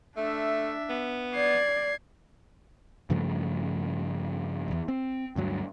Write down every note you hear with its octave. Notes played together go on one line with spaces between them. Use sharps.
A3 D4 E5
B3
D5 G#6 C7
G2 C#3 F3 A3
D1 E2
C4
D2 G2 F#3